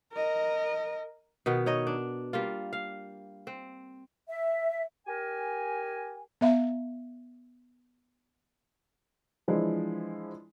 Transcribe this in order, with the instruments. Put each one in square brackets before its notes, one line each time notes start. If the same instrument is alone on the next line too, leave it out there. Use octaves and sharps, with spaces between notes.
[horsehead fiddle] A#4 D#5
[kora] B2 D#3 B3
D#4 C#5 D#5
D4
G3 A#3 F4
F5
C4
[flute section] E5
[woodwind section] G4 A#4 G#5
[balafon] B3 E5 F5
[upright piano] E3 F3 G#3 D4 E4